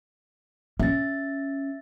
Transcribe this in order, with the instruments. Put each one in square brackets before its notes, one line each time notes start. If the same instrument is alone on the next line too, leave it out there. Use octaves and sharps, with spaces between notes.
[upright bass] C#4 [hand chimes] E5 A6